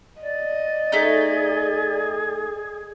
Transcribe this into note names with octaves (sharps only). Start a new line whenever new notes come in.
D5 D#5
A3 D#4 G#4